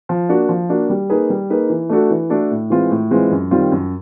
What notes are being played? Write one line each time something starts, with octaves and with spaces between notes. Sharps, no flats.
F3
A#3 D4 F#4
F3
A#3 D4 F#4
G3
A#3 D#4 G#4 B4
G3
A#3 D#4 G#4 B4
E3
A3 D4 F#4 A4
E3
A3 D4 F#4 A4
A2
E3 G#3 C4 F4
A2
E3 G#3 C4 F4
F#2
D#3 G3 C4 F4
F#2